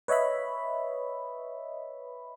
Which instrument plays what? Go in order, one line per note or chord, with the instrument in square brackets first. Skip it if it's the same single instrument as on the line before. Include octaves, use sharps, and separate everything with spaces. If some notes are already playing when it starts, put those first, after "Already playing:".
[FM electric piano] B4 C#5 D#5 E5 B5